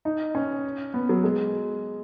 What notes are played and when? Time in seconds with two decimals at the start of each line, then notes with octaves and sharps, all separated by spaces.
0.05 D#4
0.35 C#4
0.94 B3
1.09 F#3
1.24 G#3